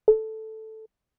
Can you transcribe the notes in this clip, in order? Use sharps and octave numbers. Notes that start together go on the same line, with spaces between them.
A4